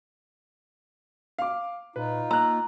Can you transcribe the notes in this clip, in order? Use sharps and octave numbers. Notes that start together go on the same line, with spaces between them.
F5 D6
A#2 D#4 F4 B4
A#3 A#5 E6 F#6